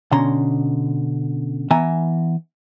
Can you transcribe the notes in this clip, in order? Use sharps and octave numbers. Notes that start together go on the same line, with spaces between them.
B2 D3 C#4 A#5 C6
E3 B3 E5 G#5 A#5